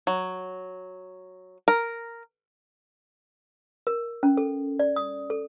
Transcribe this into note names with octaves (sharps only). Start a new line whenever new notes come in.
F#3
A#4
A#4
C#4
A4
D5
D#6
A4